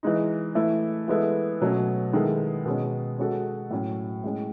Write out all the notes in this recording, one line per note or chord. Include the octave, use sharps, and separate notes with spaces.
E3 G#3 D#4
E3 A3 E4
E3 G#3 B3 E4 A4
B2 F#3 A3 C#4
D#3 G#3 B3 E4 A4
B2 G#3 C#4
G#3 C#4 F#4 A4
A2 F#3 C#4
A2 G#3 C#4